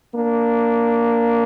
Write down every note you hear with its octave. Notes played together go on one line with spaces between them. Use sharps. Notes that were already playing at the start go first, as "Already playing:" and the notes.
A#3 D4